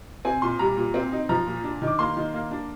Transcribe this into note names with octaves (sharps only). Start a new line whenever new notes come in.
C4 G#5
A#2 C6
G3 A#5
A#2
C4
D#4
F3 A#5
A#2
D4
D#3
D6
A#3 C6
D#3
A#3
D4